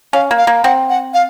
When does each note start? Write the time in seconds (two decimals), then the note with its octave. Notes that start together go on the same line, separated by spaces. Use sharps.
0.13 C#4 F5
0.31 A#3
0.38 F5
0.47 A#3
0.64 C4 F#5
0.90 F#5
1.14 F5